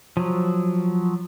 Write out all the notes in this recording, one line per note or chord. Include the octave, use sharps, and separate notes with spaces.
F3 F#3